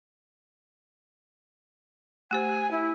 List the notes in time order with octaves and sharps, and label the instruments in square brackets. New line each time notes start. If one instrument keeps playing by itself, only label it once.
[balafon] A3 G4 C5 [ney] G#5
[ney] E4